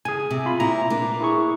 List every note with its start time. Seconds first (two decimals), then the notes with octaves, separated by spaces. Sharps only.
0.05 C#3 G#4 G#5
0.31 C3
0.46 F4 B5
0.60 A#2 C4 E4 A#5
0.90 A#3 D4 B4
1.21 E4 G#4 C#6